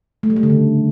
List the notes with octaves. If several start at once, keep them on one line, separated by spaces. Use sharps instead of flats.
A3
G3
A3
D3
C#3